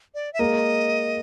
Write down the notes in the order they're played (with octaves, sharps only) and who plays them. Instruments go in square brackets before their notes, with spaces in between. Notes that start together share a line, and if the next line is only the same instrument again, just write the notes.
[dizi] D5
E5
[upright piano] G#3 A#3 [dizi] D#5